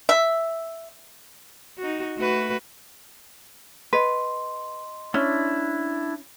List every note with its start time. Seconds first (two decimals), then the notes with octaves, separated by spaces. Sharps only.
0.09 E5
1.78 D#4 F#4
2.17 A3 F#4 B4
3.93 B4 D#5 C6
5.14 C#4 D4 E4